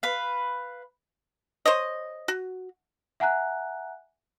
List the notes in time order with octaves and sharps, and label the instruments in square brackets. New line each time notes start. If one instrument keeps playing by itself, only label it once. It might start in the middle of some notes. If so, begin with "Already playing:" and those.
[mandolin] B4 F5
[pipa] C5 C#5 D#5
F#4
[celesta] E5 F#5 G#5 A#5 F#6